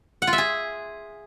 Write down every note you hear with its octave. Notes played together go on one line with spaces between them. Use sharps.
F#5
F4
E5
G#4